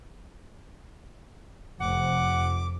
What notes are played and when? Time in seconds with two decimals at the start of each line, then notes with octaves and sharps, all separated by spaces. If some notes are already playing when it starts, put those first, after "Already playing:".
1.80 F1 F2 F#5 D6